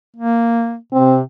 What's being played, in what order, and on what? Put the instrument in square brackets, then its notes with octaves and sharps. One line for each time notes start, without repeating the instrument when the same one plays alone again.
[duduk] A#3
[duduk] C3 [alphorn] C4